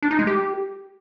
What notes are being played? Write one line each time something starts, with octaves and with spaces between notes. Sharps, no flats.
D4
D#4
G#3
G4